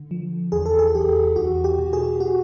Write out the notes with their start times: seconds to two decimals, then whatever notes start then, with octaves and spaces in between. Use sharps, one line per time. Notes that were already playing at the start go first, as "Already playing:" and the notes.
Already playing: D3
0.11 F3
0.52 E2 G#4
0.66 A4
0.79 G#4
0.94 E2 G4
1.36 E2 F#4
1.64 G4
1.79 B2
1.93 G#4
2.20 F#4